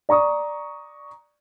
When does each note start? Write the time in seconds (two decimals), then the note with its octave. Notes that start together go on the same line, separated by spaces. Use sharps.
0.09 D5 A#5 C#6 D#6